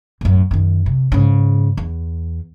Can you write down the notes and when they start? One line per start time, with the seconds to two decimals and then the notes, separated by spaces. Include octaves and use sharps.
0.21 F#2 A2
0.51 F#2 D#3
0.86 C3
1.12 G#2 C#3
1.77 E2